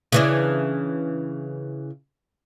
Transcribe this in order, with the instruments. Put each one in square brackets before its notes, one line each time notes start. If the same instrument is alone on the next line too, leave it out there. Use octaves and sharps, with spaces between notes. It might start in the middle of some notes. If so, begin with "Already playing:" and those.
[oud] C#3 E3 D4